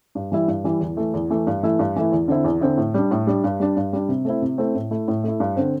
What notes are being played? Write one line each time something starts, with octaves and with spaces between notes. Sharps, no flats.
G2
E3 G3 E4
G2
E3 G3 E4
E2
E3 A3
E2
E3 A3
G2
E3 A3 E4
G2
E3 A3 E4
E2
D3 C4 E4
E2
D3 C4 E4
A2
G3 D4
A2
G3 D4
G2
G3 D4
G2
G3 D4
C3
A3 C4 E4
C3
A3 C4 E4
A2
A3 E4
A2
A3 E4
G2
D3 C4